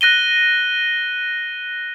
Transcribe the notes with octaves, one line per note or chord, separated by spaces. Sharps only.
F#6 A#6 D#7 G7